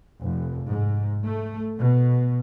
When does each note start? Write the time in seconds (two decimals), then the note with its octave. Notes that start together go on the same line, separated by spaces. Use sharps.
0.21 F1
0.70 G#2
1.25 A3
1.77 B2